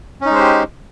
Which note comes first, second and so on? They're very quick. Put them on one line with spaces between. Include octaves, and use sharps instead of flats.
C#4 D#4 G#3 C5 G4